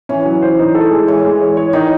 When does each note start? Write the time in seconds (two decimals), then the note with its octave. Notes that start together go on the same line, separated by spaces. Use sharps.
0.09 E3 C#4
0.25 F#3
0.42 C5
0.59 D#4
0.75 A4
0.91 G#3
1.08 E3 C#5
1.25 G#3
1.41 C#5
1.57 C#5
1.73 D#3 D#4